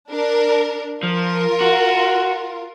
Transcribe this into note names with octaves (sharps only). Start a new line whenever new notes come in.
D4 A#4
F3 F4 A#4
F#4